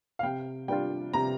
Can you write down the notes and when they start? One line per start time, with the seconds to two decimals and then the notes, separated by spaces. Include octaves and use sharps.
0.19 F5
0.23 C3 G5
0.68 G3 D4 F4 G5
1.13 C3 A#5